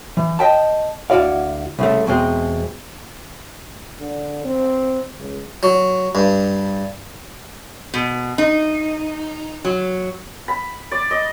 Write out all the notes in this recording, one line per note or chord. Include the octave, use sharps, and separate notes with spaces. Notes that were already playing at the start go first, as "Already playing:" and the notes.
E3
D#5 E5 G5 A5
D2 E4 F#4 D5 F5
C2 C#3 A3
E2 B2 G#3 C4
D3
C4
C#2
F#3
G2
B2
D#4
F#3
B5
D5
D#5